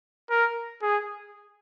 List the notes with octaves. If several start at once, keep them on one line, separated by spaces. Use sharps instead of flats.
A#4
G#4